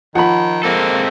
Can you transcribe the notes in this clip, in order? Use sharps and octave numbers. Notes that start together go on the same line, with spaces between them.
D#3 F3 F#5 B5
G#3 A#3 C4 A4